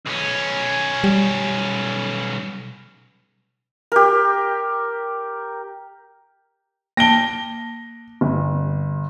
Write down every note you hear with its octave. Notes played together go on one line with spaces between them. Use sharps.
B1 C#4
G3
G4 A#4
A#3 A5 A#6 D7 G7
G1